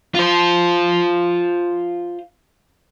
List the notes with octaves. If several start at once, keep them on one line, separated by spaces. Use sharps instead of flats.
F4 C5